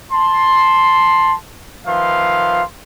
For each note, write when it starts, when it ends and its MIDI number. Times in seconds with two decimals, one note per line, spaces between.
0.12 1.34 81
0.12 1.34 84
1.87 2.62 51
1.87 2.62 53
1.87 2.62 71
1.87 2.62 76
1.87 2.62 77
1.87 2.62 84